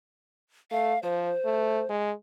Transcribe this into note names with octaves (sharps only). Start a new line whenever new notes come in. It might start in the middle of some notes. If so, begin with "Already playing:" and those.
A3 F5
F3 C5
A3
G#3